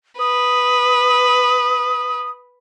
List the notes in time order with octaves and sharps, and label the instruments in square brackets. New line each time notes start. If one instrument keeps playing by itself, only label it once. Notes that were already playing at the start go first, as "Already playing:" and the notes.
[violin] B4 [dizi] D#6